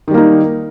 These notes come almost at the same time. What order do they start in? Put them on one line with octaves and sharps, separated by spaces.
D#3 G3 A#3 D#4